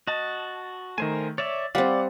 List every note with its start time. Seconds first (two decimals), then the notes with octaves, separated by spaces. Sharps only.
0.07 F#4 D#5 A5
0.98 D#3 A3 A#4 C5 G#5
1.38 C#5 D5 E5 A6
1.75 G3 C4 D5 F5 F#5